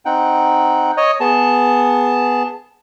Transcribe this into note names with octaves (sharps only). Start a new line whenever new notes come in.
C4 D#4 F#5 G5
C#5 D#5
B3 G#4 A5